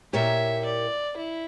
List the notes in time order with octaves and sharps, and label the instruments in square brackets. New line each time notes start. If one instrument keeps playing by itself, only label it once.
[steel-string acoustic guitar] A#2 A#3 E4 G4 C#5 [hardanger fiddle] E5
[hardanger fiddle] D5
E4